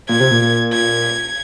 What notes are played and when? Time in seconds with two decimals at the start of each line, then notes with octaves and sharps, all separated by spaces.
0.09 A#2 G#6
0.20 C3
0.31 A#2
0.42 A#2
0.73 G#6